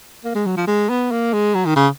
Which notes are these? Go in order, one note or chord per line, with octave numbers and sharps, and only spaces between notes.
A#3
G#3
F#3
F3
G#3
B3
A#3
G#3
F#3
D#3
C#3